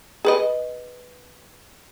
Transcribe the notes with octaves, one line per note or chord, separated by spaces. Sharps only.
G#4 B4 D#5